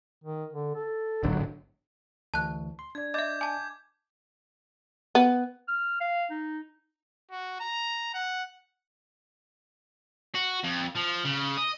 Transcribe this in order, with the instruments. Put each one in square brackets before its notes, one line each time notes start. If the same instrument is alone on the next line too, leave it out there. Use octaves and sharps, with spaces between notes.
[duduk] D#3
D3
A4
[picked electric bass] D1 G#1 D3 [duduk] F#3
[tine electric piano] D2 E3 [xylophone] A5 F#6
[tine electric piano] C6
[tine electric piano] D4 D5 [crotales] G#6
[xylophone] D#5 E5 [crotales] D6 G6
[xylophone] G#5 A5 [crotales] D6
[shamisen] B3
[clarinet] F6
F5
D#4
[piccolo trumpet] F#4
A#5
F#5
[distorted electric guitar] F#4
F2
F3
C#3
D#5